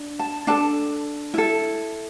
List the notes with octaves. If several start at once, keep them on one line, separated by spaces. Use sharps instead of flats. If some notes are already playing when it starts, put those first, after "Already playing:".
Already playing: D4
A5
D4 A4 A5
E4 A4